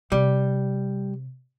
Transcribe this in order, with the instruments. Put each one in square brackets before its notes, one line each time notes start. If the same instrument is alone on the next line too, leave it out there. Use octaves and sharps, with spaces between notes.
[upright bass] C3 [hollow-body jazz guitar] G3